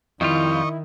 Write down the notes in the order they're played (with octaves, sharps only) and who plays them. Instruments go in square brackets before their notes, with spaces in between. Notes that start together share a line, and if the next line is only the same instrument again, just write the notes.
[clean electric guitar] F2 G3 F4 [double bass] D#3 [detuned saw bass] E4 [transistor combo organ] D#5 C#6